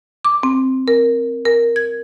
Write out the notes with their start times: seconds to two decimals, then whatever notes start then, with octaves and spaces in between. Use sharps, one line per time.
0.25 D6
0.43 C4
0.88 A#4
1.45 A#4
1.76 G#6